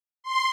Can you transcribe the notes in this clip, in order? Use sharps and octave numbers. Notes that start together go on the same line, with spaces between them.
C6